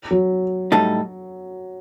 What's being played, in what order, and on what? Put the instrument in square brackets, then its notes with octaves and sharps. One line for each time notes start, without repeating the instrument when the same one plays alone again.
[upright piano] F#3
[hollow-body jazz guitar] A2 G3 D#4 A4